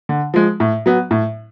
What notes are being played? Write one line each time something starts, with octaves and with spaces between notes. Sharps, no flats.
D3
F3 G#3
A2
F#3 B3
A2